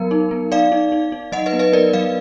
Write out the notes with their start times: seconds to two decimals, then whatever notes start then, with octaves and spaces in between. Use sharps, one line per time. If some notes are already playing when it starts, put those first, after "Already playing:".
Already playing: F#3 B3 A#4
0.11 D#4
0.31 B3
0.52 D#4 D5 F5
0.72 D#4
0.92 D#4
1.12 D#4
1.32 F#3 D#5 F#5
1.46 B4 D#5
1.53 B3
1.59 B4 D#5
1.73 B3 A#4 D5
1.93 F#3 D5 F5